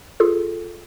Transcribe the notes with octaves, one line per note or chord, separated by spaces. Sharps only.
F4 G#4 A4